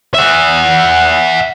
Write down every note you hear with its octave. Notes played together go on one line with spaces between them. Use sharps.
E5 F#5